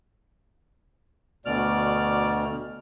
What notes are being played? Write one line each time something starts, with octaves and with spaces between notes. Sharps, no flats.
D2 B2 D5 F6